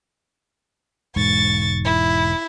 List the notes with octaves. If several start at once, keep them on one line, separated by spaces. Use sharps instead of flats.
E1 G#2 C#6 A6
E4